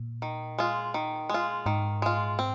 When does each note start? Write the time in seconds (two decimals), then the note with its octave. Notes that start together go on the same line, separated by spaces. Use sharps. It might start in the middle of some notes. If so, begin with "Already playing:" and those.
Already playing: A#2
0.22 D#3
0.58 G#3 F4
0.94 D#3
1.29 G#3 F4
1.66 G#2 D#3
2.02 G#3 F4
2.39 C4